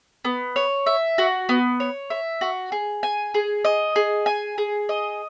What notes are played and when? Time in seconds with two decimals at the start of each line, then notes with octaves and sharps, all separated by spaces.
0.25 B3
0.56 C#5
0.86 E5
1.18 F#4
1.49 B3
1.80 C#5
2.10 E5
2.41 F#4
2.72 G#4
3.03 G#5
3.34 G#4
3.65 D#5
3.96 G#4
4.26 G#5
4.58 G#4
4.89 D#5